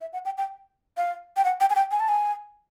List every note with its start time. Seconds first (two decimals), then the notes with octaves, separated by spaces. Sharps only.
0.01 E5
0.13 F#5
0.25 G5
0.38 G5
0.97 F5
1.37 G5
1.45 F#5
1.61 G5
1.70 G#5
1.75 G5
1.91 G#5
2.00 A5
2.09 G#5